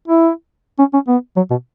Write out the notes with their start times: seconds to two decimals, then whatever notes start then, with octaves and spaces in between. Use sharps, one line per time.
0.08 E4
0.79 C#4
0.94 C#4
1.08 B3
1.36 F#3
1.50 B2